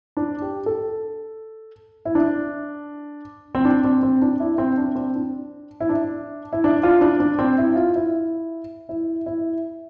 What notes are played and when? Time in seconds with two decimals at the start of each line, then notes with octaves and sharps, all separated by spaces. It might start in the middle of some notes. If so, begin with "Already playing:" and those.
0.17 D4
0.42 G4
0.66 A4
2.05 E4
2.15 D4
3.55 C4
3.65 D4
3.84 C4
4.03 C4
4.22 D4
4.40 E4
4.58 C4
4.78 D4
4.95 C4
5.15 D4
5.80 E4
5.89 D4
6.53 E4
6.64 D4
6.83 F4
7.01 D4
7.20 D4
7.39 C4
7.58 E4
7.76 F4
7.96 E4
8.89 E4
9.26 E4